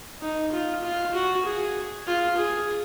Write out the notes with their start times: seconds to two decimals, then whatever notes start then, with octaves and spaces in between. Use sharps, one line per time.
0.22 D#4
0.53 F4
0.84 F4
1.14 F#4
1.45 G#4
2.07 F4
2.38 G#4